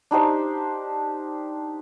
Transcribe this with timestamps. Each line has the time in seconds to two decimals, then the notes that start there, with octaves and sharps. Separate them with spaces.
0.11 D4 D#4 G4 C5